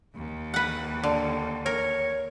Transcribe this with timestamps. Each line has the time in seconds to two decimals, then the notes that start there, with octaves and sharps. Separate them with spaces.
0.15 D#2
0.54 B4 F#5
1.04 D3
1.66 A#4 C#5